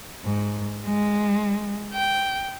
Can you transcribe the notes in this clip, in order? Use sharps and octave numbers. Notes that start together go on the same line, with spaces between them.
G#2
G#3
G5